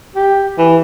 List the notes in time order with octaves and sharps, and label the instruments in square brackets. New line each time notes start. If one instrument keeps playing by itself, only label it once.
[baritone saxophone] G4
E3